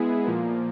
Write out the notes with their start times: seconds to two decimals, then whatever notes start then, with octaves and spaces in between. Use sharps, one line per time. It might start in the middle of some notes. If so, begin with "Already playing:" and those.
Already playing: G#3 B3 E4 G#4
0.25 A#2 F3 A#3